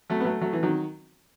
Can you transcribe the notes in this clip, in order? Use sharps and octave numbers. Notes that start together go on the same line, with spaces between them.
F#3 A3
B3
F#3 A3
F#3 A3
E3
D#3 F#3